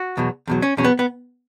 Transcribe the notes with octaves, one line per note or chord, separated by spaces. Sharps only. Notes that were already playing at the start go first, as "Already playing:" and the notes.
Already playing: F#4
E2 B2 F#3
E2 B2 F#3
C#4
E2 B2 F#3 C#4
B3
B3